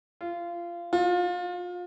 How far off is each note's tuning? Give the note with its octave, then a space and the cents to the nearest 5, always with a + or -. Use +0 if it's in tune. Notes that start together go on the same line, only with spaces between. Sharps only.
F4 -20
F4 +30